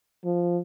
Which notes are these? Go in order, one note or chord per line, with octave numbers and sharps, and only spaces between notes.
F3